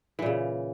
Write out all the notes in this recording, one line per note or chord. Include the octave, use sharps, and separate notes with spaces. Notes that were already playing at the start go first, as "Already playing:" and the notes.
A#2 C#3 E3